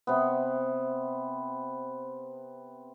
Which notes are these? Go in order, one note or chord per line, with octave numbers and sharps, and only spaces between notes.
C3 B3